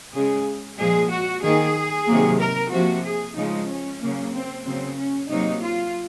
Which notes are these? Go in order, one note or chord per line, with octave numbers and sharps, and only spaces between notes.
C#3 G#3 G#4
A#2 F3 G#3 G#4
F#4
D#3 A#3 G#4
C3 D#3 F#3 A#3
A#4
C3 F3 A#3 F#4
G#4
C#3 F3 G#3 D#4
C#4
C#3 F#3 A#3
C4
C#3 F#3 A#3 C4
C#4
C3 F#3 A#3 D#4
F4